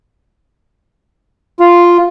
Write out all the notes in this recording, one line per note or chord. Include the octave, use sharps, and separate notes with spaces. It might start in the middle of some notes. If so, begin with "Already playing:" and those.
F4